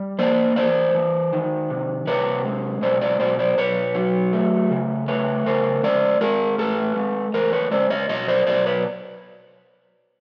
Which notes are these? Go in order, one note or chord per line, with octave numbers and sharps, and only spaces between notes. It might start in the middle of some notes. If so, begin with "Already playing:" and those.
Already playing: G3
A#3 C5 D5
E3 C5 D5
E3
D#3
C3
C3 B4 C#5
G#3
B2 C5 D5
C5 D5
B2 C5 D5
C5 D5
B2 B4 C#5
F#3
A3
C#3
A3 B4 C#5
C#3 A#4 C5
G#3 C5 D5
G#3 G#4 A#4
A2 A4 B4
G#3
E2 A#4 C5
B4 C#5
G#3 C5 D5
C#5 D#5
B2 C#5 D#5
C5 D5
B2 C5 D5
B4 C#5